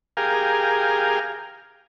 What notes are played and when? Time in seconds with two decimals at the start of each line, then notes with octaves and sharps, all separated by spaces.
0.17 G4 G#4 A#4 F5